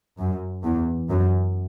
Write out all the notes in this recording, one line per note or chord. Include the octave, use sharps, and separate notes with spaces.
F#2
E2
F#2